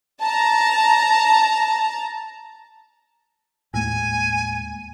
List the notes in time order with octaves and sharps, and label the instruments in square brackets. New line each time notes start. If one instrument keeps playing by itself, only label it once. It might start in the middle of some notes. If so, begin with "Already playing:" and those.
[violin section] A5 A#5
[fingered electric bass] D#2 G#3 A#3 [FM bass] A2 [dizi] G#5